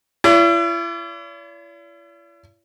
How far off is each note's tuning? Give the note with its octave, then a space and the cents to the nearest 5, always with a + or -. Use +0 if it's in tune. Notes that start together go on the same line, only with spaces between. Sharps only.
E4 +40 D5 -45